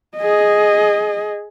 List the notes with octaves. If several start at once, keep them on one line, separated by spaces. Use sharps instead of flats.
G#4 D#5